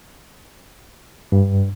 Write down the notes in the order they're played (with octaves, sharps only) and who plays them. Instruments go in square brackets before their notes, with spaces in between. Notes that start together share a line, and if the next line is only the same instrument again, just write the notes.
[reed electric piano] G2